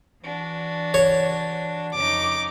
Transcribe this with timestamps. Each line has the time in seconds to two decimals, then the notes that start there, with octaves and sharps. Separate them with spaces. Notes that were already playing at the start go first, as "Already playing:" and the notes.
0.22 E3 D4 F#4
0.94 C#5
1.95 F2 C#4 D#4 D6